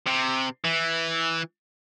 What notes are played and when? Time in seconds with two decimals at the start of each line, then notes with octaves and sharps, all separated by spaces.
0.07 C3
0.65 E3